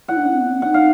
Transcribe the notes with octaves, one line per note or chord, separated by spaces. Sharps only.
E4 F#5
D4
C#4
C4
B3
C4
C#4
D#4 F#5
F5